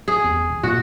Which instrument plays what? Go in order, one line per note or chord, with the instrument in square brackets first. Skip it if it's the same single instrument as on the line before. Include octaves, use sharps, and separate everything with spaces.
[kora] G#4
[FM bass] E2
D#1
[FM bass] A#2 [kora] F#4